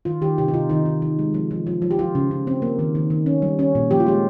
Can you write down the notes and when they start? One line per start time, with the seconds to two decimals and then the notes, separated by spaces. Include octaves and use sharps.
0.05 D#3 F4
0.21 D#3 G4
0.38 C3 G4
0.48 D#4
0.53 C3 F4
0.69 D#3 D#4
0.85 D#3
1.02 D#3
1.19 G#3
1.34 F3
1.51 F3
1.67 F3
1.82 F3
1.91 G4
1.99 F3 F4
2.15 C#3
2.31 C#3
2.47 C4
2.62 A#3
2.79 D#3
2.95 D#3
3.10 D#3
3.26 C#4
3.42 G3
3.59 C#4
3.75 A#2
3.91 F3 G4
4.00 F4
4.07 G#3 G4